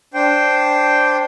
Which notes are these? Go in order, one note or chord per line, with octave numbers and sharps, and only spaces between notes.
D4 C5 G5